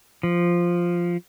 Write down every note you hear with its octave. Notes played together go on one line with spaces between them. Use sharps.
F3